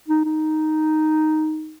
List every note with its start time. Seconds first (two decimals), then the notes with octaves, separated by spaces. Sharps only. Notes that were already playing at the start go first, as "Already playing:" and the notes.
0.08 D#4
0.25 D#4